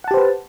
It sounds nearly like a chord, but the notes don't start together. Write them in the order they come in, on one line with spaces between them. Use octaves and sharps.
F#5 A5 G4 C5 B4